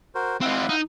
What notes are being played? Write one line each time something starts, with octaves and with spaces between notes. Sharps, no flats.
F#4 A#4 C5
C4 D#4 E4 F5 F#5
D#4